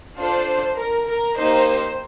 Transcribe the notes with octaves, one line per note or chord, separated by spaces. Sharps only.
D4 F4 A4 C5
A#4
A#4
A#3 D#4 G4 C5